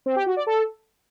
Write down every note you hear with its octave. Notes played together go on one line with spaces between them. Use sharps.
C4
G4
F#4
D5
A4